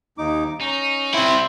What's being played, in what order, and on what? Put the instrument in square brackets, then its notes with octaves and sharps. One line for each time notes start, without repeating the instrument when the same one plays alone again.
[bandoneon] D#2 D#4 D6
[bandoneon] C#4 [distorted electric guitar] D#4
[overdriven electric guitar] C3 E4 [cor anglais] C4